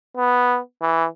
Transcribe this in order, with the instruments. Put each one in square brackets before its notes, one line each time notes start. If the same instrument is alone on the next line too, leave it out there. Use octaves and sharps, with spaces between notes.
[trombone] B3
E3